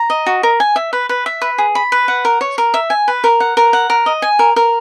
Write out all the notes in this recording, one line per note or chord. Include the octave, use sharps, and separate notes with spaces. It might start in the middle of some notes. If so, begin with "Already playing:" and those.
Already playing: A#5
D#5
F#4
A#4
G#5
E5
B4
B4
E5
B4
G#4
B5
B4
F#5
A#4
C#5
A#4
E5
G#5
B4
A#4
F#5
A#4
F#5
A#4
D#5
G#5
A#4
A#4